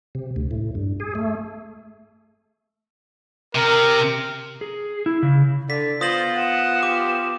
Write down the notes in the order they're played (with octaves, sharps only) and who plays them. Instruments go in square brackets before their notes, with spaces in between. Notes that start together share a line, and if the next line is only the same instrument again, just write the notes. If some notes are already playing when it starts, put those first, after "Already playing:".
[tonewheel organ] C3
D2
A2
G2
G#4
A3
[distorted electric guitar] C3 [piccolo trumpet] A#4
[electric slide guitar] G#4
E4
C#3
[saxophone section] D3 [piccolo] A6 [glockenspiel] B6
[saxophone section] F3 B3 F4 [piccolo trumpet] C5 [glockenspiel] D#6 A#6 F#7
[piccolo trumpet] F#5 [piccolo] E7
[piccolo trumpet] G4 [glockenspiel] D6